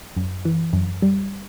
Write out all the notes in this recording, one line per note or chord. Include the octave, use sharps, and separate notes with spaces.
F#2
E3
F#2
G3